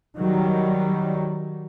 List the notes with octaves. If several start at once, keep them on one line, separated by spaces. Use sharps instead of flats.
D#3 F#3 G3